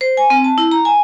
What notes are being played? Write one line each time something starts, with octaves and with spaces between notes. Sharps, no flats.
C5
G#5
C4
A5
E4
A#5
G#5